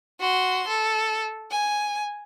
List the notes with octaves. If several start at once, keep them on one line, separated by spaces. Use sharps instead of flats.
F#4 C6
A4
G#5